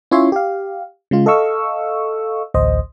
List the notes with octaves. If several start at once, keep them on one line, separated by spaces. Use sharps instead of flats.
C#4 E4 F4 C#5 E5 C6
G4 F5
C#3 G#3 F4
A4 D#5 F5 C#6 E6
A1 D2 C5 D#5